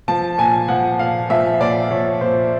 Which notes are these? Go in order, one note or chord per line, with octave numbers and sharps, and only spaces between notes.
F3 A5
A#2 G#5
F3 F#5
A#2 F5
F3 E5
A#2 D5
F3 C#5
A#2 C5